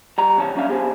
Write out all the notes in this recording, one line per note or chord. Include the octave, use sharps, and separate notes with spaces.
G3 A#5
C3 E3 C#5 A5
F#3 G3 C#4 D4 E5 F5
B3 G4 G#4 C5